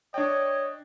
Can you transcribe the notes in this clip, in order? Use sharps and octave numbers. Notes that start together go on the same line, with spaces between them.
D4 C#5 D#5 G5